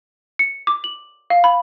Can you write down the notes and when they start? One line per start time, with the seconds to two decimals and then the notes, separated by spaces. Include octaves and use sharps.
0.39 C#7
0.67 D6
0.84 F#7
1.30 F5
1.44 B5